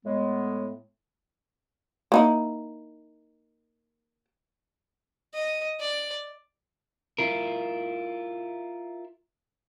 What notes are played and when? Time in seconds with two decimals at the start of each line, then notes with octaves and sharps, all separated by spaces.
0.05 A2 G#3 B3
2.12 A#3 D#4 E4
5.34 D#5
5.80 D5
7.18 E4 F4 A#4